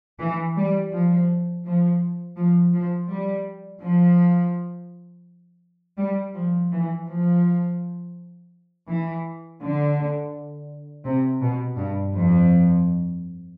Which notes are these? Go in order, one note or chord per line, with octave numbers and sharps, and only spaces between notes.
E3
G3
F3
F3
F3
F3
G3
F3
G3
F3
E3
F3
E3
D3
C3
B2
G2
F2